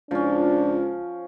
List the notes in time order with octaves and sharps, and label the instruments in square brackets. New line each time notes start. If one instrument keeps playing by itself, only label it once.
[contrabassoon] C#2 [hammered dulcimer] F3 C#4 [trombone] D4